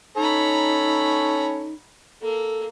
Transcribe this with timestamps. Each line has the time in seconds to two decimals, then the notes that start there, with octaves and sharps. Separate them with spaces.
0.17 C#4 D#4 A4 C#5 A#5 B5
2.22 A#3 A4